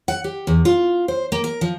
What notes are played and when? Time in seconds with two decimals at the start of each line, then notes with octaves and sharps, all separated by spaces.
0.08 F#5
0.24 G4
0.47 E2
0.65 F4
1.08 C5
1.32 A#3
1.44 A#4
1.61 F3